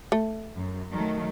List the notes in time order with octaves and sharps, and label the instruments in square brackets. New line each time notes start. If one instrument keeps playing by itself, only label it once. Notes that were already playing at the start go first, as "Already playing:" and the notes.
[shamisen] A3
[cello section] F#2
D#3 F#3 A3